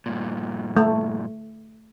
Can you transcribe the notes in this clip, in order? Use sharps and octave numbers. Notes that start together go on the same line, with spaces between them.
G2 A#2
A3